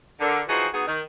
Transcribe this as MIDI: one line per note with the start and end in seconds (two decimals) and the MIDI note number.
0.20 0.41 50
0.20 0.41 70
0.49 0.67 52
0.49 0.67 53
0.49 0.67 63
0.49 0.67 66
0.49 0.67 68
0.49 0.67 72
0.74 0.84 59
0.74 0.84 63
0.74 0.84 66
0.74 0.84 68
0.87 1.00 51